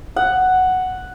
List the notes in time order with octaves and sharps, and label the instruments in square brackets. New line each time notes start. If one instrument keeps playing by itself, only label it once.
[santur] F#5